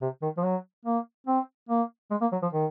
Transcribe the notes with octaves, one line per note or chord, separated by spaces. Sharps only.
C3
D#3
F3
F#3
A#3
C4
A#3
G#3
A#3
F#3
F3
D#3